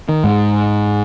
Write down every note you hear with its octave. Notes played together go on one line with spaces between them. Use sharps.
D#3
G#2